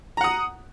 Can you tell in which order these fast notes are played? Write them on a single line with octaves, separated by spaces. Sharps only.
A#5 F#5 D#6